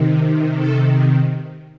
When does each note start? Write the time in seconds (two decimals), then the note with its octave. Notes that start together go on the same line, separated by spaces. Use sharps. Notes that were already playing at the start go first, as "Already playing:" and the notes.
Already playing: C3 D#3
0.57 A4